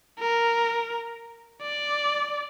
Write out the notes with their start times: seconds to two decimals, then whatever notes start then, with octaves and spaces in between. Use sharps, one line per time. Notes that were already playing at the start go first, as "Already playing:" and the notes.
0.19 A#4
1.62 D5